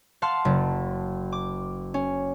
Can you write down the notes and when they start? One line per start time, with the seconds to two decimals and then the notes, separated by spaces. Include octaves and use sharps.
0.22 F5 F#5 A5 C6 F6
0.45 F#1
1.32 D6
1.94 C#4